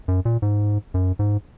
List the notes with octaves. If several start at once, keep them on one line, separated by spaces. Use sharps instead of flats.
F#2
A#2
G#2
F#2
G#2